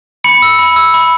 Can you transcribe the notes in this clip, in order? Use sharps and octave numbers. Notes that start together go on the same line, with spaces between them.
B5 C#7
E6
B5
E6
B5